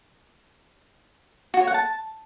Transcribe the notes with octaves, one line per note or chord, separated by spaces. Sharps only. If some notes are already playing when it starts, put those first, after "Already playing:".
F#4
C#5
F#5
A5